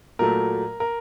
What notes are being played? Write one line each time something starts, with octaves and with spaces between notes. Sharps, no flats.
A#2 F#3 A3 A#4
A#4